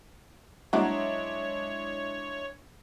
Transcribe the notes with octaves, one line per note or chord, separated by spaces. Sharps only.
F#3 G#3 D4 E4 F#4 C#5